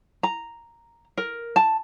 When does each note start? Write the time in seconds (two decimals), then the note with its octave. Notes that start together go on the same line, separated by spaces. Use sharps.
0.23 A#5
1.17 A#4
1.56 A5